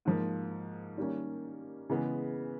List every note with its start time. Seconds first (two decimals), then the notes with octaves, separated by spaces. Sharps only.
0.05 G#2 F3 A#3
0.98 D#3 G3 A#3 C#4
1.89 C#3 E3 G#3 B3